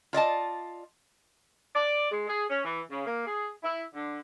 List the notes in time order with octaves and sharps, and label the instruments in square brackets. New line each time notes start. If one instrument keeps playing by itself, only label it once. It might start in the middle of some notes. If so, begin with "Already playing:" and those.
[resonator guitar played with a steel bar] F4 D5 D#5 A5
[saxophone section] D5
G#3
G#4
C#4
E3
C#3
A#3
G#4
E4
D3